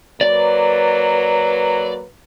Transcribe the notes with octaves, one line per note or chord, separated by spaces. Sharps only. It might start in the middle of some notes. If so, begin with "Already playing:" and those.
F#3 A#3 B4 D5